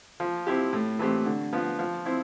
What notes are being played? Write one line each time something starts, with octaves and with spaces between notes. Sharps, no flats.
F3
C4 E4 G4
A2
E3 A3 C4 G4
D3
F3 B3 F4
F3
C4 E4